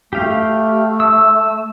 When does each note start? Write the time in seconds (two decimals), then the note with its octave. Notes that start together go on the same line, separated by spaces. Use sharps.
0.13 A3 G4 F5
1.00 E6